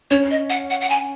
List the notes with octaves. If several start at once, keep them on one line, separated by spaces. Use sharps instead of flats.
C#4 C#5
D#5
F#5
F#5
F#5
G#5